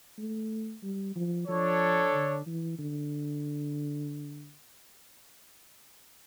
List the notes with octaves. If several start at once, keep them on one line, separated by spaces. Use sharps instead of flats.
A3
G3
F3
F3 D4 A4 C#5
D3
E3
D3